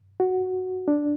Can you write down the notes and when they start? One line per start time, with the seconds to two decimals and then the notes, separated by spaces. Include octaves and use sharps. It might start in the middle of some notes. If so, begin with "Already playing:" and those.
0.20 F#4
0.88 D4